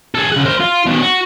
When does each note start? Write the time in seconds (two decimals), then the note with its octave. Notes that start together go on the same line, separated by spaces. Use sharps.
0.15 G#4 A4
0.32 C#3 F#5
0.45 A#4 C5
0.60 F4
0.86 B2 D#3
1.01 F#4